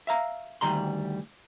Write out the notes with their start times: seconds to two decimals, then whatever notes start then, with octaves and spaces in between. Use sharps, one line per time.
0.07 E5 F5 A#5
0.61 D2 D#3 G3 A#5 C6